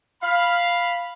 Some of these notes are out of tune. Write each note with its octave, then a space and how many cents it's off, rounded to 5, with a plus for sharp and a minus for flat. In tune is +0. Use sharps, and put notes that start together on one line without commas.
F5 +0 B5 +0